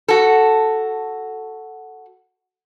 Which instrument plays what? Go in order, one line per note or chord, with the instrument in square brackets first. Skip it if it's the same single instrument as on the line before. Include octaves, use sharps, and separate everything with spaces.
[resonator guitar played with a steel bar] F#4 A4